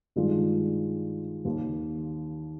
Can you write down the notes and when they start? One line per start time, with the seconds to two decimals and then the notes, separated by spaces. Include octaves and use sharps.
0.16 G2 D#3 G#3 D4 F4
1.45 D#2 D#3 A#3